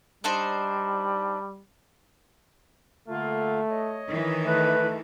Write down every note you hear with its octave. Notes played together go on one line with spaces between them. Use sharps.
G3 D4 D#4 C5
D3 A3 A#3 F4
C#5 D#5
D#3 E3
A3 B4